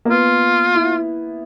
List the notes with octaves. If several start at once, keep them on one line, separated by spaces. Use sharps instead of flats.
A#3
B3 F4
E4